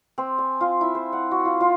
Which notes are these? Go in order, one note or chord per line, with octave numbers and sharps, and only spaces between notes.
C4
G#5
F4
E4
C5
F#5
F#4
F4
F4